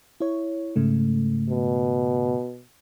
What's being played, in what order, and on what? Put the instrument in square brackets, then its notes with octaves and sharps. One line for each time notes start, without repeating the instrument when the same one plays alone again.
[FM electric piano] E4 C#5
G#2 C#3 A3
[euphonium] B2